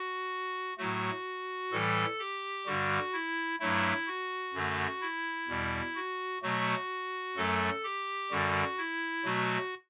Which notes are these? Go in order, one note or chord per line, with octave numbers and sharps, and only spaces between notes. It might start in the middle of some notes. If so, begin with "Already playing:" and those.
Already playing: F#4
A2 F#3 A3 F#4
A2 E3 G3 A4
G4
G2 D3 G3 F#4
E4
G2 F#3 A3 E4
F#4
F#2 D3 A3
E4
E2 B2 G3
F#4
B2 F#3 A3 F#4
F#2 F#3 A3 A4
G4
F#2 D3 G3 F#4
E4
B2 F#3 A3 F#4